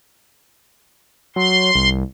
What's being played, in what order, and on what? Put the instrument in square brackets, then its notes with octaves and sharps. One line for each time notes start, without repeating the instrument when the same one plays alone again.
[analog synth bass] F#3 [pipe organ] C6
[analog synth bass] C2